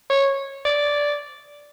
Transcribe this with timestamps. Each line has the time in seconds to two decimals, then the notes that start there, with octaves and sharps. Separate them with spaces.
0.10 C#5
0.65 D5